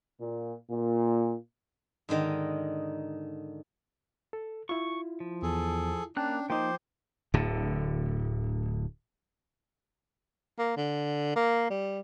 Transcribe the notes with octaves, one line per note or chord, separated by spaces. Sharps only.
A#2
A#2
G#2 D3 D#3 D#5
A4
E4 F4 C#6
F3
E2 G#4 A4
A#3 C#4 D4 G5 A5 F#6
F3 A#3 D#4 F4 C5 G5 D6
D1 A2 D3
A#3
D3
A#3
G3